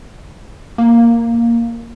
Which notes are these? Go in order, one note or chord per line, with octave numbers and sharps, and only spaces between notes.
A#3